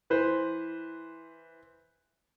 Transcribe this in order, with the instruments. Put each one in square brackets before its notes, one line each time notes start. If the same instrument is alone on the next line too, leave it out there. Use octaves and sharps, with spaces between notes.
[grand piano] E3 B4 C5